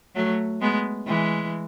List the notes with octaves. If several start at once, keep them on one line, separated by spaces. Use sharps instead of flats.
F#3 A3
G#3 B3
E3 G#3